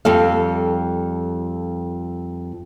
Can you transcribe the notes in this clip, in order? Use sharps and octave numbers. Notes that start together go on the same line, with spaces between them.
F2 G3 A4 F5